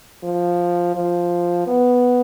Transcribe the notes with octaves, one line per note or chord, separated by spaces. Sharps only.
F3
F3
B3